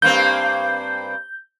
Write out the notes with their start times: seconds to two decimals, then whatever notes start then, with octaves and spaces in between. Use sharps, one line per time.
0.02 G2 A#3 C4 G6